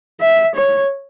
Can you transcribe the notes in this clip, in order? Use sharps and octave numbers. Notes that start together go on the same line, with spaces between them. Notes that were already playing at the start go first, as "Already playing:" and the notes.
E5
C#5